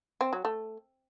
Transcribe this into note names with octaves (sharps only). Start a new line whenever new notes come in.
C4
F#3
A3